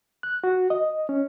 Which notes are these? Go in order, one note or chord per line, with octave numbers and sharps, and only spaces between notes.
F#6
F#4
D#5
C#4